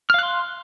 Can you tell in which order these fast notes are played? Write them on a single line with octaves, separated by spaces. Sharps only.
F6 F5 F#6 C6